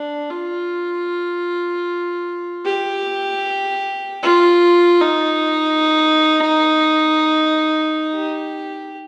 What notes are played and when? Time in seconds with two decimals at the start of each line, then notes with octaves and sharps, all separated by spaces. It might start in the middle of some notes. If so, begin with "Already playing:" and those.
Already playing: D4
0.30 F4
2.65 G4
4.23 F4
5.01 D#4
8.15 G4